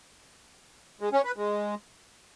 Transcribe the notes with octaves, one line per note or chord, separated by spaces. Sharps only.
G#3
C#4
B4
G#3